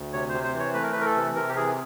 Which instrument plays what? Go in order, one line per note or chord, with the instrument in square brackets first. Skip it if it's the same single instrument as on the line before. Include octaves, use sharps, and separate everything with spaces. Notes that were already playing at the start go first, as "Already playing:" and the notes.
Already playing: [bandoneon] D2
C3 C#5
C3 C5
C5
E3
C#5
A3 B4
A#4
E3 B4
A#4
A4
C3
C3 A#4
G4
E3 G#4